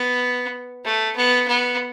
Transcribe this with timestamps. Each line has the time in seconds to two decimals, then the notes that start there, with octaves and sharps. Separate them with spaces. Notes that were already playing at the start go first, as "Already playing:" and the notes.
Already playing: B3
0.85 A3
1.17 B3
1.48 B3